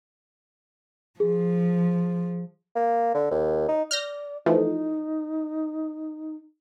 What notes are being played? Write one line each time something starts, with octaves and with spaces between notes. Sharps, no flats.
F3 G#4
A#3
D3
D#2
D#4
D5 F6 G6 A#6
E3 F3 A3 D#4